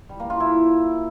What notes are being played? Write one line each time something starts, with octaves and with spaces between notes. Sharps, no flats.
G3
A#3
F4
E4